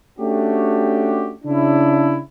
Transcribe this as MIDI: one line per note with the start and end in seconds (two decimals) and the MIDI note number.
0.19 1.34 57
0.19 1.34 61
0.19 1.34 62
0.19 1.34 66
0.19 1.34 67
1.44 2.20 49
1.44 2.20 62
1.44 2.20 64